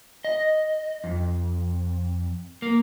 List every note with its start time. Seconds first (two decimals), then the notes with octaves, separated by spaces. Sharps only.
0.25 D#5
1.04 F2
2.62 A#3